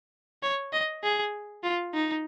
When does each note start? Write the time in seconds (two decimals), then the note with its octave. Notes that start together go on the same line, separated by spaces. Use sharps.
0.43 C#5
0.73 D#5
1.03 G#4
1.63 F4
1.94 D#4